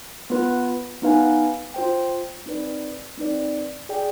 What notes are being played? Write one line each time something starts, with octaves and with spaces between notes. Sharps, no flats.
B3 F4 B4
B3 D#4 B4 F5 G#5
F4 C5 G5
C4 D#4 B4 D5
C4 D#4 B4 D5
G#4 D5 G5